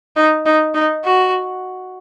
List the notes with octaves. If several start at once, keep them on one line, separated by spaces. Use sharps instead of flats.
D#4
D#4
D#4
F#4